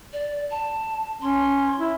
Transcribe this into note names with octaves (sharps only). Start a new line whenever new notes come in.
D5
A5
C#4 C6
E4